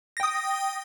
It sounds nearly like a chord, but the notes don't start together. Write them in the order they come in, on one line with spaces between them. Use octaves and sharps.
A#6 G5 D#6